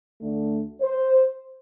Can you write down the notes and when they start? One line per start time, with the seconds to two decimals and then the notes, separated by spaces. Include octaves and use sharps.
0.20 D2 D3 A3
0.81 C5